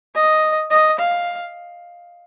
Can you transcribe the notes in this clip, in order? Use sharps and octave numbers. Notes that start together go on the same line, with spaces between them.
D#5
D#5
F5